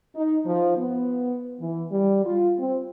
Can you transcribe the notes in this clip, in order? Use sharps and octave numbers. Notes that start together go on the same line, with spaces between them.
D#4
F3
B3
E3
G3
F4
C4